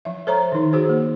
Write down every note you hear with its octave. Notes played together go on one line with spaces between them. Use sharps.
F3 E5
A4 C5 C#5 E5 A#5
D#3 D#4
F#4 G#4 C5
A#3